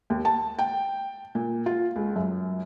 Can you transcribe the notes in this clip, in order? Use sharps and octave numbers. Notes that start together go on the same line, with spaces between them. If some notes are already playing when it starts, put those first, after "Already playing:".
D#2
A5
G5
A#2
F4
C#2
F#2